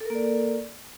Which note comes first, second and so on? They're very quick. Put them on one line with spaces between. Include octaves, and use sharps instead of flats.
A4 A#4 A#3 D5